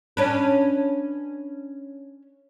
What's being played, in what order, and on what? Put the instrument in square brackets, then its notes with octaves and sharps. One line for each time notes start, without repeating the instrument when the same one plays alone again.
[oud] C#4 D4 B4